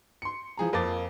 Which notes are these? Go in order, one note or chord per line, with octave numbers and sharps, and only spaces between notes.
C6 C#7
E3 F3 G#4 A#5
F2 A#3 C4 D6 A6